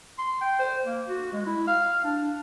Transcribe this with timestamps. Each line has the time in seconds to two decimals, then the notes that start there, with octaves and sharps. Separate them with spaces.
0.18 C6
0.41 G5
0.59 C5
0.85 A#3
1.08 F#4
1.32 G#3
1.47 E4
1.67 F5
2.04 D4